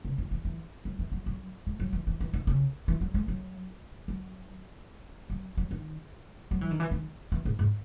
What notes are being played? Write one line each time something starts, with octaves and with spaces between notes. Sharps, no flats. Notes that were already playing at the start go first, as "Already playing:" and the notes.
C#3
D#3
E3
E3
F#3
E3
F#3
F#3
G#3
F#3
E3
E3
E3
D#3
C#3
E3
F#3
G#3
F#3
F#3
F#3
F#3
D#3
F#3
E3
D#3
E3
D#3
E3
G#2
G#2